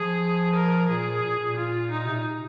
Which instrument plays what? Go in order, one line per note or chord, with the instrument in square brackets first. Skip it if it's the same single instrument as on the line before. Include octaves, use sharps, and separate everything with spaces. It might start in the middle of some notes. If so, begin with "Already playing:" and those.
Already playing: [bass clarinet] F3 [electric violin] G#4
[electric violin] A#4
[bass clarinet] A#2 [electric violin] G#4
[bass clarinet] A#2
A#2
[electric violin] F4
D#4
[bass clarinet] C3
A#2